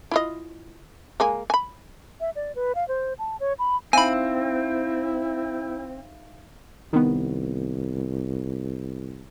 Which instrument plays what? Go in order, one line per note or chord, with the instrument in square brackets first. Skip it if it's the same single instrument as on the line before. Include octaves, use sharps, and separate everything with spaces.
[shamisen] E4 F4 D#5
G#3 A#3 G#5
G#5 B5
[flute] E5
D5
B4
F5
C5
A5
C#5
B5
[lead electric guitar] C4 [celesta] D#4 E5 F5 [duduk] E4 [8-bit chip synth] G#5 B5
[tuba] C2 [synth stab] D#3 B3